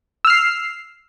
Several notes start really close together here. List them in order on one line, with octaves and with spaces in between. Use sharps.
E6 F6 C7